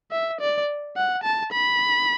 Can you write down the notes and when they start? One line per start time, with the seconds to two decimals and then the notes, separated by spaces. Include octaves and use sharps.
0.12 E5
0.41 D5
0.97 F#5
1.24 A5
1.52 B5